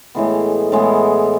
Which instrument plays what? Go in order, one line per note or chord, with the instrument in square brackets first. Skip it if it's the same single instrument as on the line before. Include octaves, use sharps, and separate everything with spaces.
[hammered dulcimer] A2 E3 G#3 B3
A2 E3 G#3 B3